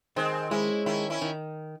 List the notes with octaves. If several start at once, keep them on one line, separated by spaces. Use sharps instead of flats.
D#3 G#3 C4
G#3 C#4 E4
D#3 C#4 E4
C#4 E4
D#3